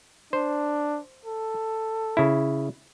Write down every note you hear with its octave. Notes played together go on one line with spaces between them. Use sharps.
D4 C5
A4
C#3 E4